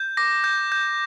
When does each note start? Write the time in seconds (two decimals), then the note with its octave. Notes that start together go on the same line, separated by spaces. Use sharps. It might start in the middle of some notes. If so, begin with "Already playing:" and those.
Already playing: G6
0.17 D6 A#6
0.44 G6
0.72 G6